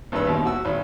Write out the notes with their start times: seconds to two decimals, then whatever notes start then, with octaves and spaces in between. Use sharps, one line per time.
0.12 G#1 G2 B4 E5 E6
0.27 D#2 B2
0.45 F#4 E6
0.65 G#1